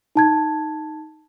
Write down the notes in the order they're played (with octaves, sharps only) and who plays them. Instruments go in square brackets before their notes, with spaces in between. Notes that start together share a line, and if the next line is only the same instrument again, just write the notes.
[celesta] D#4 A5 G#6